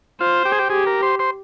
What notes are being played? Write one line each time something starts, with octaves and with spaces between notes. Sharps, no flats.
F4 C5
G4
G#4
G4
G4 G#4
A#4
C5
C5